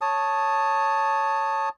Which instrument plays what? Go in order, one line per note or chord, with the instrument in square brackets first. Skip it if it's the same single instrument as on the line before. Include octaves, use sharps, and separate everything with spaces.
[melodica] C#5 A5 D#6